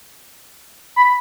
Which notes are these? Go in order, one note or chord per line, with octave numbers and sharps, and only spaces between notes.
B5